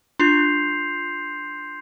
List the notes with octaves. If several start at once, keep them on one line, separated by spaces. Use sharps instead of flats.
D4 F4 C6 G6 C7 F7